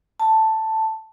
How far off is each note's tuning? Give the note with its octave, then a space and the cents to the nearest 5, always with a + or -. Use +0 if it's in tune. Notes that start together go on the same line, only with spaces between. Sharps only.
A5 +5